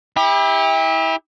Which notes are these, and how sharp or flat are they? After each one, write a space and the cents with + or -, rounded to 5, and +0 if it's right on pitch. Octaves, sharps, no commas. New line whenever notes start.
E4 -25 G4 +35